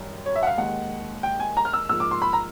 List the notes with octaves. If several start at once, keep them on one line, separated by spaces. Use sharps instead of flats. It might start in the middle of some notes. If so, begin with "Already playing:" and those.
Already playing: F#2 D#3 G3
C#5
E5
F#5
F5
D#2 D#3 G#3 F#5
G5
G#5
A#5
F6
E6
G#2 F3 A#3 E6
D6
C6
B5
A#5